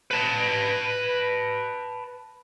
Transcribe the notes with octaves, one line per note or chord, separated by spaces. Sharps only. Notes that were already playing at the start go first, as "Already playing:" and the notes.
B4 A5